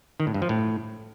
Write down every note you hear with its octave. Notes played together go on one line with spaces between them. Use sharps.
D#3
A2
G2
F3
A2